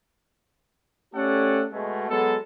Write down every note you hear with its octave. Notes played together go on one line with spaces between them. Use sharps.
A3 C#4 G4 A4 D5 F#5
B2 G#3 A3
F#3 G#3 B3 A4